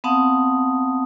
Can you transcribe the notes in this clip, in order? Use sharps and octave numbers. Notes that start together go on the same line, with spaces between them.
B3 C4 F5 F#5 A5 D#6